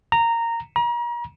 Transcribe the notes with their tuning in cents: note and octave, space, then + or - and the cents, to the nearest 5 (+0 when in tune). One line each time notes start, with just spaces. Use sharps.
A#5 -10
A#5 +40